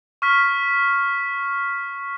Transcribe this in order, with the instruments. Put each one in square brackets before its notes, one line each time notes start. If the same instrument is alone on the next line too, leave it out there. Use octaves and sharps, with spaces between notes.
[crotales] C#6 F6 B6